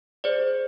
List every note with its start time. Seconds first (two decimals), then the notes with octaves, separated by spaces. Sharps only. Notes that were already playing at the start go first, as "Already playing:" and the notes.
0.24 G#4 C5 D5